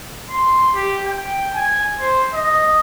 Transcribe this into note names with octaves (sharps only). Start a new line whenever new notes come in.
C6
G4
G5
G#5
C5
D#5